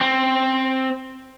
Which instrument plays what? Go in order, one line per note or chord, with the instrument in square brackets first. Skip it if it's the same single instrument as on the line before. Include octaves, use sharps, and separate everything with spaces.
[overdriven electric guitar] C4